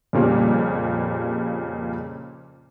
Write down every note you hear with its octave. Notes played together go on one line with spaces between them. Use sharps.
F2 A#2 C#3 G3 A#3